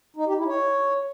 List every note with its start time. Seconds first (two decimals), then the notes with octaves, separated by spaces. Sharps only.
0.16 D#4
0.27 G4
0.37 E4
0.47 C#5